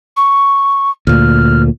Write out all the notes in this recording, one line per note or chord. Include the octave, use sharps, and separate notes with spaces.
C#6
D2 A#2 F6